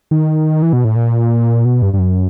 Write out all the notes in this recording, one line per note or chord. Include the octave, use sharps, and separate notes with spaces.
D#3
E3
B2
A2
A#2
B2
G2
G2
F#2